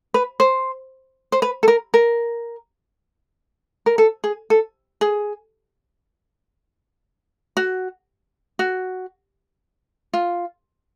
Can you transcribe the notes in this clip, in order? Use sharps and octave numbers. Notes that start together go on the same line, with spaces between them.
B4
C5
C5
B4
A4
A#4
A#4
A#4
A4
G#4
A4
G#4
F#4
F#4
F4